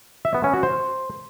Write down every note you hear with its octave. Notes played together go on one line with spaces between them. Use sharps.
E5
B3
C#4
F#4
C5